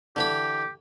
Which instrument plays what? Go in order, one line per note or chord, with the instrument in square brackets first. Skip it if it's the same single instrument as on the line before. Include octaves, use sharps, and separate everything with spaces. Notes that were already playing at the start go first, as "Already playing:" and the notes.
[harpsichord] D3 E3 B5 [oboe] G4